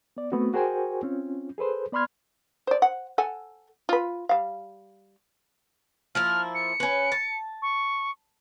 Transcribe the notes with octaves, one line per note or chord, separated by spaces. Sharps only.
B3 D5
A3 B3 C4 F#4
F#4 G#4 A#4 C5 G5 G#5
C4 C#4 F4
G#4 A4 B4 C5
B3 D5 B5 C6 F6 G#6
C5 D5
F#5
A4 F#5 G#5
F4 B4
G3 F5
F3 A#3 E4 F6
C#7
C#4 B4
A5
C#6